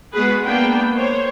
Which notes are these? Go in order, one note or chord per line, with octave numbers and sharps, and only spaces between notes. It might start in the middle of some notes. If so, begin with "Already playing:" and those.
G#3 B3 F#4 G#4 B4
A#3 B3 D4 G5
C5 C#5